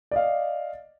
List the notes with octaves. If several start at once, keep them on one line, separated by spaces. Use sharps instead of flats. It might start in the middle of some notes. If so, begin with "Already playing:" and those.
D5 D#5 F5